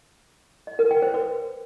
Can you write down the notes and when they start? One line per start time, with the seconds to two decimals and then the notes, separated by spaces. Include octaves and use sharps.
0.67 D#5
0.79 A#4
0.91 G5
1.02 C5
1.14 B4